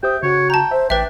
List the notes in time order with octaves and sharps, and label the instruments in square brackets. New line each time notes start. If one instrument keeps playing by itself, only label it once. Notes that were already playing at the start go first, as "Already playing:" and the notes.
[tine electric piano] G4 C5 D#6 [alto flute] E5 [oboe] G5
[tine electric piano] C#3 [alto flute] F#4 [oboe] C#5
[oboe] G5 [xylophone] A5 A#5
[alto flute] C5 [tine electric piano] E5
[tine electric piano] A1 G6 [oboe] D4 [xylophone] B4 E5 [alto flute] G5